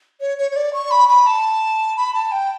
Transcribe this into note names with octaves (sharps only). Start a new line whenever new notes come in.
C#5
C#5
C#5
D5
C#6
B5
B5
A5
B5
A5
G5